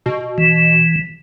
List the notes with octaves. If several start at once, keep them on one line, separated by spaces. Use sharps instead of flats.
B2
E3